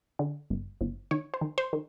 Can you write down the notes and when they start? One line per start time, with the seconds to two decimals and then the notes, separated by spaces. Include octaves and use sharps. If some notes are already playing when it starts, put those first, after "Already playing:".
0.19 D3
0.50 G1
0.81 G1
1.11 D#3 C#5
1.34 C5
1.41 D#3
1.58 C5
1.73 D#3